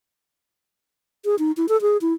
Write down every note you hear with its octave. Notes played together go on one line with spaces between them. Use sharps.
G#4
D#4
E4
A4
G#4
E4